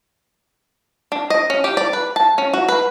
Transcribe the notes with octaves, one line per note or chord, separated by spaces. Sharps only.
D4
D#5
C#4
G4
D5
B4
A5
C#4
F#4
B4